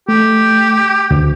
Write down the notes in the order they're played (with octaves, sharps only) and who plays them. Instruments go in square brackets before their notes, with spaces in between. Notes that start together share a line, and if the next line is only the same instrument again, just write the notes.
[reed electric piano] A3 [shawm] G4
[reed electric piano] D2